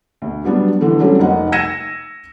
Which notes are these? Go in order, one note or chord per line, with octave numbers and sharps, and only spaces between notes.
D2
F#3 G3 B3 D4
D3 E3 A3
F#3 G3 A3 C4 C#4
F1 A#3 D#4 F#5
E6 G#6 A#6 C#7 D#7 E7